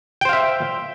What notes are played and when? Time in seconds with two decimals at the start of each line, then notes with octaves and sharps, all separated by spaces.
0.21 G5
0.25 C5
0.29 F5
0.33 E5